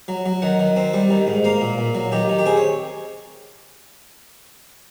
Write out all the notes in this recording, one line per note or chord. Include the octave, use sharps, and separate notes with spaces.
F#3
F#3
D#3 F#5
D#3
C4
G3
D#3
G#2
A#3 F5
A#2
A#2
F#3
D#3 G4
D#3
G4
C4 G#4
C#5